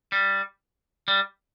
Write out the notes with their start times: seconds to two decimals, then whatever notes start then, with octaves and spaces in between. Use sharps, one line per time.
0.12 G3
1.08 G3